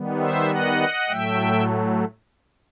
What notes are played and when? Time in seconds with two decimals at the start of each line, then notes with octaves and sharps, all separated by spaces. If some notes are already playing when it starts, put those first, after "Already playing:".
Already playing: D#3 G3 B3
0.18 C5 E5
0.49 D#5 F#5
1.08 A2 F#3 A3 E5 G5